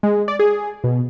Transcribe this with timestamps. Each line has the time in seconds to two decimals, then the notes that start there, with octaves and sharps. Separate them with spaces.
0.03 G#3
0.28 D5
0.39 G#4
0.84 B2